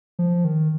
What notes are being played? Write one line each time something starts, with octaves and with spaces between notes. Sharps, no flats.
F3
D#3